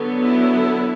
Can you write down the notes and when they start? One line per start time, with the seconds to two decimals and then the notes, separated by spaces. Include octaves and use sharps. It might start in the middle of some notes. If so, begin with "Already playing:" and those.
Already playing: D3 F#3 B3
0.19 E4